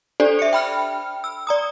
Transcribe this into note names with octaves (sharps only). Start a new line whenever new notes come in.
D4 G4 A4 C5 D5
E5 C#7
G5 B5 F6
E6
D5 A#5 D#6